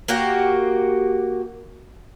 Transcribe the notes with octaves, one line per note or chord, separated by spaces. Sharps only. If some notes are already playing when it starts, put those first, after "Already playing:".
A#3 F#4 G4